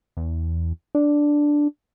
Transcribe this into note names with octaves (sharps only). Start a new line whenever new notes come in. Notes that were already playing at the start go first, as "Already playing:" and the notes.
E2
D4